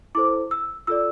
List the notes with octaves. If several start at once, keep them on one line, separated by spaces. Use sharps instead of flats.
E4 A4 C5 D6
E6
F4 A4 D5 E6